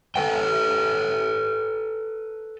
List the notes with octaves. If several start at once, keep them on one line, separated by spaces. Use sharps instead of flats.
A4 B4 G5